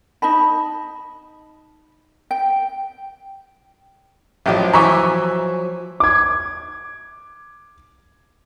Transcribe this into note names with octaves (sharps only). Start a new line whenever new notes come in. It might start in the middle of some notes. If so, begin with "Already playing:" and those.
D#4 D#5 A5 B5
G5
A1 F3 F#3 G4 D#5
E3 E5 G#5 A#5 C#6 D6
D6 G#6